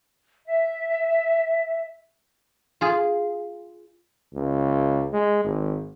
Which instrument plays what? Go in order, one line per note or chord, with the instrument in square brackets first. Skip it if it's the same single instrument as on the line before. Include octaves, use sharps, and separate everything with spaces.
[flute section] E5
[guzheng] F4 G#4
[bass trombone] C#2
G#3
G#1